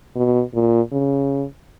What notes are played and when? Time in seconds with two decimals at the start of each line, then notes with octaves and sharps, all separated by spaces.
0.16 B2
0.54 A#2
0.92 C#3